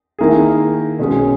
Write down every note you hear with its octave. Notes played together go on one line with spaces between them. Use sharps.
D#3 A#3 E4 G#4
B2 G#3 C#4 G#4